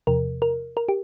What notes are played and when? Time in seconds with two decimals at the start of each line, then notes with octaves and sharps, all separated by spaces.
0.07 E2 C3 F3 A#4
0.42 A#4
0.77 A#4
0.89 G4